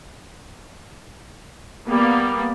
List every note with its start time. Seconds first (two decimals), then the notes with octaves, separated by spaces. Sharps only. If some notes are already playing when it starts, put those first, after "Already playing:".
1.86 G3 A#3 B3